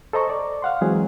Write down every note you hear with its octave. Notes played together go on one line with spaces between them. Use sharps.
A4 C5 D#5 A#5 C#6
D5
F5 F#5 C6
E3 F#3 G#3 C4 G#4